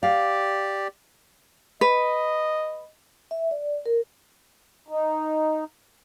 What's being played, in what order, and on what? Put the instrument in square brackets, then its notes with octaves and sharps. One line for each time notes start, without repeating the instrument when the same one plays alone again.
[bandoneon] G4 D5 [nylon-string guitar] F5
[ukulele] B4 [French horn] D#5
[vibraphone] E5
D5
A#4
[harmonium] D#4